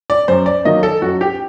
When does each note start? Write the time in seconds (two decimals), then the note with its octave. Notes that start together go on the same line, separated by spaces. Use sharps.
0.10 D5
0.28 F#2 C5
0.46 D5
0.65 D#3 F#3 A#3 D#5
0.83 A4
1.02 F#2 F#4
1.21 G4